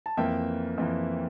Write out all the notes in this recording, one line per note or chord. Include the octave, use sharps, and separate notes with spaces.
A5
F2 E3 A#3 E5 G5
F2 E3 A#3